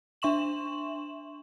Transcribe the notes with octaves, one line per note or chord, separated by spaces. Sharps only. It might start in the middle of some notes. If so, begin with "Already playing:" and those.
D4 E5 C6 C#6 E7 F#7